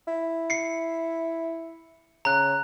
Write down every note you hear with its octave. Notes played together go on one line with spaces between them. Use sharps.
E4
C7 C#7
C#3 A#5 F#6